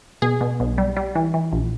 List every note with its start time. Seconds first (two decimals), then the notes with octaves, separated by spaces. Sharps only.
0.22 B2 G#4
0.41 B2
0.60 B1
0.78 G3
0.97 G3
1.15 E3
1.34 E3
1.52 A#1